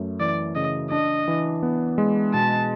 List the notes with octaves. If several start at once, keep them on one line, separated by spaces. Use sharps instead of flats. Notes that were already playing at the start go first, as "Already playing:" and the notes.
Already playing: F#2 A3
E3 D5
C#3 D#5
D4 D#5
E3
B3
G#3
B2 A5